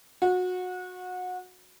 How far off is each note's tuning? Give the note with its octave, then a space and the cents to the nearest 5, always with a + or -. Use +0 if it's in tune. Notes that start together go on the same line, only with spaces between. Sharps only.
F#4 -25